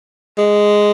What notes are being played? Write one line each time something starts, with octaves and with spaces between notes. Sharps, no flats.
G#3